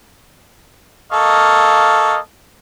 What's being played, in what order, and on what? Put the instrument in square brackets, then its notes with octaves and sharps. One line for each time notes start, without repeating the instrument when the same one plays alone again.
[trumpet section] A#3 A4 D#5 F5 C#6